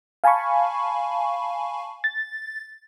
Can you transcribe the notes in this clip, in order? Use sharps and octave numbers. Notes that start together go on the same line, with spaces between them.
F5 G#5 A5 B5 C#6
A6